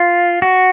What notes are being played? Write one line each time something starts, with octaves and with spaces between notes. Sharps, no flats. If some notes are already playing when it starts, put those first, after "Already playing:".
Already playing: F4
F#4